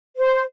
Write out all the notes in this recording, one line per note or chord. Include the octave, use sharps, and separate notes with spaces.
C5